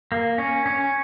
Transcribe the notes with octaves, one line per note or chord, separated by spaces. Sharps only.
A#3
C#4
C#4